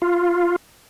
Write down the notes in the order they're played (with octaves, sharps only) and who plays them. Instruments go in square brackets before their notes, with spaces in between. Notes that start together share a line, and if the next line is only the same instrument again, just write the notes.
[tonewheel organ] F4